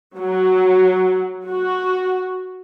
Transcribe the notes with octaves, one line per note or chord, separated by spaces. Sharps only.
F#3
F#4